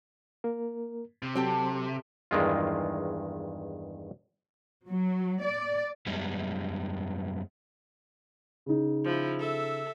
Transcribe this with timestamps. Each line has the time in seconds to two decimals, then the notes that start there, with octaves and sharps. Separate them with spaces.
0.44 A#3 A#4
1.22 C3
1.35 F#3 C4 G4 A4
2.31 E2 G2 D#3 G#3 F4
4.88 F#3
5.45 D5
6.06 F#2 G3 G#3 B3
8.66 C#3 D#4
9.05 F3 E4
9.40 A4 E5